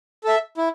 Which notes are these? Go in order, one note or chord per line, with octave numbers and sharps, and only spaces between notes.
A4 E5
E4